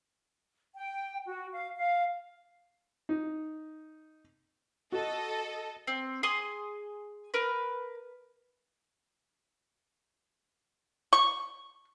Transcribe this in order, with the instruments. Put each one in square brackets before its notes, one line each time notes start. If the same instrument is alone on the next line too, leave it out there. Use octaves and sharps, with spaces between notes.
[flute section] G5
F#4
F5
F5
[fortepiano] D#4
[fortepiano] F#4 [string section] A4 D#5
[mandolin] C4
G#4 G#5 C6 D#6
A#4 B4
[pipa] C#6